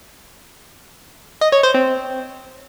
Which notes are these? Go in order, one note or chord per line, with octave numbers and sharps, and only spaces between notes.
D#5
C#5
C5
C4